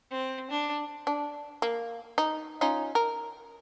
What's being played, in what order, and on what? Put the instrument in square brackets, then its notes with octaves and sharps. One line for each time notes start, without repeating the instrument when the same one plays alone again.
[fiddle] C4
D4
[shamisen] D4
A#3
D#4
C#4 D#4 F4
A#4